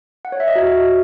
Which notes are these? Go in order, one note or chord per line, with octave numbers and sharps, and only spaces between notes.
F#5
C#5
E5
D#5
F#4